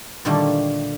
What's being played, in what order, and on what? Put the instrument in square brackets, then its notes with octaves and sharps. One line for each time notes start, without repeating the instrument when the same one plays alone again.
[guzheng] A#2 D3 D#3 G3 A3 A#3